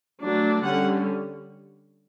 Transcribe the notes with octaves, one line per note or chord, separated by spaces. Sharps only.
F#3 A3 D4
D3 G3 C#4 F#5